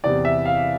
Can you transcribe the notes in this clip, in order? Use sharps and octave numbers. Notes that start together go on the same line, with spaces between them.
E2 C3 E3 D5
E5
F5